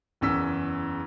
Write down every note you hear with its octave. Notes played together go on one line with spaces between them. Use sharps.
F#1 E2 C#4 E6 B6